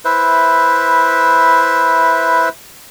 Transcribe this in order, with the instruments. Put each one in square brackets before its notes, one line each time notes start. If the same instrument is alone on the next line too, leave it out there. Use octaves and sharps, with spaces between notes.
[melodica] E4 B4 C5 E5